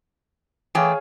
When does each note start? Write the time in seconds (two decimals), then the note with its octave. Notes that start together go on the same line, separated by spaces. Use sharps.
0.75 E3 A3 G#4 C#5 F5 G5